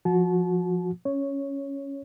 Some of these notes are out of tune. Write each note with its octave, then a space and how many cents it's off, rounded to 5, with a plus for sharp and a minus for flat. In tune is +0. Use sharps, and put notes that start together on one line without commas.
F3 +0 F#4 -25 A5 -30
C#4 +0 C#5 +0